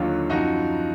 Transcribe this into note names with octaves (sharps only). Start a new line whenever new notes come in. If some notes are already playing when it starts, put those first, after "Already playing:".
Already playing: D#2 D3 F#3 F4
F#2 F3 D#4 F#4